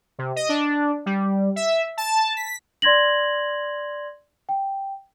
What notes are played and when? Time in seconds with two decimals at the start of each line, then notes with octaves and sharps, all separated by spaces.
0.19 C3
0.36 D#5
0.49 D4
1.06 G3
1.56 E5
1.97 A5
2.37 B6
2.82 D5 C6 G#6 A#6 F#7
4.49 G5